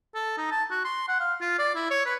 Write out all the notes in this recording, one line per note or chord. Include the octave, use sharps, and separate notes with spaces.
A4
D#4
A5
F#4
C6
F#5
F5
F4
D5
E4
C#5
B4